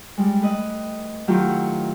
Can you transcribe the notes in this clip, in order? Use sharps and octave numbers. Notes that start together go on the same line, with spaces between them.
G3 G#3
A3 B4 D#5
D#3 F#3 A3 E4 F4 G4